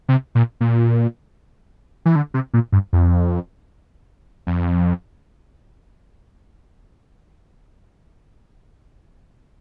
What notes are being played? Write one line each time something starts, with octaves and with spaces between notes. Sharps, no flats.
C3
A#2
A#2
E3
D3
C3
A#2
G2
F2
F2